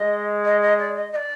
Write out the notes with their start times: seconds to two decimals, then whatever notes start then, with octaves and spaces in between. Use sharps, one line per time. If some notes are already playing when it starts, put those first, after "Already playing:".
Already playing: G#3 D#5
0.45 D#5
0.62 D#5
0.79 D5
0.95 D#5
1.12 D#5
1.16 D5